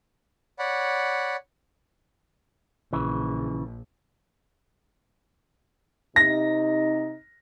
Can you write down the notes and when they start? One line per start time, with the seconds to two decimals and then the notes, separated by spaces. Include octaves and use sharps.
0.59 C#5 D5 F#5 B5
2.93 A#1 C#3 E3
6.16 C3 D#4 A#6